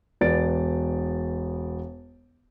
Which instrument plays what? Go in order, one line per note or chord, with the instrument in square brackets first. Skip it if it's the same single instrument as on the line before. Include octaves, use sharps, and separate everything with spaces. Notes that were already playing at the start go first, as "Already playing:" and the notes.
[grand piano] E1 B3 D5 A6 D7